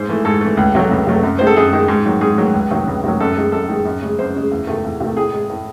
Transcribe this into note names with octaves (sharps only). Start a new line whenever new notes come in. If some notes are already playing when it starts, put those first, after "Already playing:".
Already playing: G#2 C5
E3 A3
G#2 A4
E3 A3
C#2
C3 F#3 A3
C#2
C3 F#3 A3
F#2
D#3 G#3 C5
A4
F#2 G#4
D#3 G#3
G#2
D#3 F#3
G#2 G#4
D#3 F#3
C#2
C3 D#3 F#3
C#2
C3 D#3 F#3
F#2 A4
D#3 G#3
F#2 A4
D#3 G#3
F#2
C#3 G#3
F#2 C5
C#3 G#3
E2
C3 D#3 A3
E2
C3 D#3 A3
A2 G#4
G#3
A2